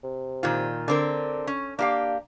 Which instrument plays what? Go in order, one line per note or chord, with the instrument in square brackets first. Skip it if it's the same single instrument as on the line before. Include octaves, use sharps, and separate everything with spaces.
[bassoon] C3
[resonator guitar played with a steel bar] A#2 D#3 F4
[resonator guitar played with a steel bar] D3 C4 A#4 [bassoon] D4
[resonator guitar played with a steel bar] C#4
[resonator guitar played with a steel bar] A#3 G4 F5 [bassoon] D4